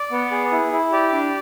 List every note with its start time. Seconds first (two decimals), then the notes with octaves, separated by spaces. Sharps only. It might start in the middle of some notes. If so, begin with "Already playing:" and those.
Already playing: D5
0.11 B3
0.31 G#4
0.52 E4
0.72 E4
0.92 G4 D5
1.13 D4